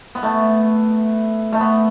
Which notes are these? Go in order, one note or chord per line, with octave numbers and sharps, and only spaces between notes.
B3
A3
A3
B3